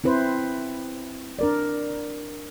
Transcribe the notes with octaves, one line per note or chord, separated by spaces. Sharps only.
C4 E4 B4 C5
D4 A#4 D5